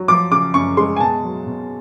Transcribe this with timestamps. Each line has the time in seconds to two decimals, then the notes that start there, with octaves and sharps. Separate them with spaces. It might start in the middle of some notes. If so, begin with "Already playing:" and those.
Already playing: F#3
0.08 F3 D6
0.31 C#3 D6
0.54 F#2 C#6
0.77 G#3 C6
0.96 G#5
1.00 B2 A5
1.24 F#3
1.47 B2